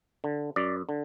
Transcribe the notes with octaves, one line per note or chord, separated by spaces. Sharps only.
D3
F#2 D5
D3